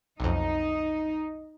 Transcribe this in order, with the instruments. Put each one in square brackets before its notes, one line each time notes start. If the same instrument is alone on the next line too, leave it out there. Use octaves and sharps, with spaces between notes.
[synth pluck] B1 F2 [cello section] D#4